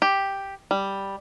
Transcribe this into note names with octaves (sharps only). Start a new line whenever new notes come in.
G4
G3